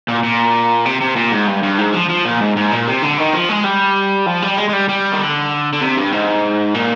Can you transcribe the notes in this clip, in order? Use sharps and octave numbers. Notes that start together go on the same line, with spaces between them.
A#2
A#2
C3
C3
A#2
G#2
G2
G2
G#2
F3
F3
A#2
G#2
G#2
A#2
C3
D3
D#3
F3
G#3
G3
F3
G3
G#3
G#3
G3
G3
D#3
D3
D3
C3
G2
G#2
A#2